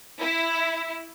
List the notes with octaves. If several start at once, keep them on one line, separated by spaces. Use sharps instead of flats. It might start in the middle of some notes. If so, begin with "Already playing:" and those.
E4